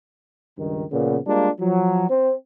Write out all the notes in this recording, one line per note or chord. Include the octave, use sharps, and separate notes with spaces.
C#2 G2 D#3
A#2 C#3 F3 B3
G3 G#3 A#3 D4 F4
F3 F#3
C4